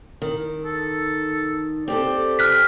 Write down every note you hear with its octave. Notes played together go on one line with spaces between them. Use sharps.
D#3
A4
C4 G4 A4 D5
F6 F#6 B6